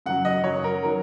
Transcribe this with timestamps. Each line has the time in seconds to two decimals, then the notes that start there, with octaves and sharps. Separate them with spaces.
0.06 F#2 C#3 F#3 F#5
0.25 D#5
0.44 F#2 C#3 F#3 C#5
0.64 A#4
0.83 D#3 F#3 A#4